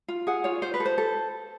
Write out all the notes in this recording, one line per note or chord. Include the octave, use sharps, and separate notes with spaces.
F4
G#4 F#5
F4 C#5
F4 C5
B4
A4
C5
A4